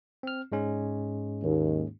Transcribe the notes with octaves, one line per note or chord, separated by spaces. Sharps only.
C4 F6
G#2 G#3 C#4
D#2